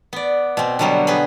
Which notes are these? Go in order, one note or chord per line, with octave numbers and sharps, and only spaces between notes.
B3 D5
B2 C4
B2 D3 F#3 G3 B3
B3 G#4 B4